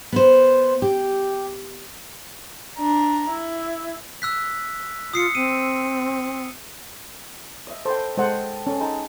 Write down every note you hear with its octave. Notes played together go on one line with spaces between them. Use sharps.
B3 C5
G4
D4 A#5
E4
E6 F#6 B6
F4 D#6 C7 C#7
C4 D#7
D#5 E5
A4 B4 C5 G5
G#3 A4 C5 D#5 F#5
C#4 A4
G#3 D#4 A5